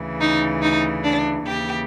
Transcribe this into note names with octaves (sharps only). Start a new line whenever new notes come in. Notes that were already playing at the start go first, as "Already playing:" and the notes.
Already playing: D2 C#3 E3
D#4
D#4
D4
D#2 C#3 E3 G4